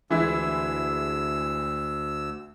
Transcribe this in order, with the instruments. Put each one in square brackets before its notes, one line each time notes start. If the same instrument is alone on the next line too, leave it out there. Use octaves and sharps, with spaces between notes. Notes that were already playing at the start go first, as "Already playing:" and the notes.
[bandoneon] D2 E6 [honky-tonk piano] E3 G#3 E4